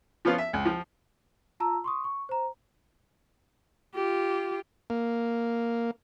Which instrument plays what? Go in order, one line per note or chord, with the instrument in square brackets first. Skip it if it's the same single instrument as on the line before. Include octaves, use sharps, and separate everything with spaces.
[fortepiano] F3 B3 C#4 F4
E5
C#2
F3
[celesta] F4 A5 A#5 E6
C6 C#6 D#6
C#6
C5 A#5
[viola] F4 G4
[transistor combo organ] A#3